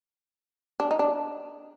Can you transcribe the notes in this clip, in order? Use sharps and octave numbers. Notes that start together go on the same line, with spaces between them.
D4
D#4
D4